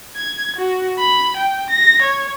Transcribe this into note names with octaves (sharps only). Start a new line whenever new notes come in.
G#6
F#4
B5
G5
A#6
C#5